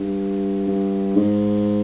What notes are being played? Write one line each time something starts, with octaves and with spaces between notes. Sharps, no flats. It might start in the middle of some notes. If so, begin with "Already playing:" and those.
Already playing: G2
G2
G#2